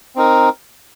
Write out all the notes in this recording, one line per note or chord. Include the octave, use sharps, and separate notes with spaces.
C4 D#4 A#4